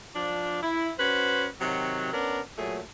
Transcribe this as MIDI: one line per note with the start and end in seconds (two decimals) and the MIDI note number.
0.15 0.59 53
0.15 0.59 62
0.63 0.90 64
0.98 1.47 61
0.98 1.47 66
0.98 1.47 71
0.98 1.47 72
1.61 2.09 48
1.61 2.09 51
1.61 2.09 54
2.13 2.40 59
2.13 2.40 61
2.13 2.40 62
2.13 2.40 70
2.58 2.80 46
2.58 2.80 54
2.58 2.80 57
2.58 2.80 68